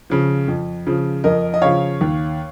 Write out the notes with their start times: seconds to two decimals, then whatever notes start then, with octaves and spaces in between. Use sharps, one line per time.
0.10 C#3 F3
0.48 F2
0.87 C#3 F3
1.24 F2 A#4 D#5
1.54 D#5
1.62 C#3 F3 C#5 F5
2.01 D#2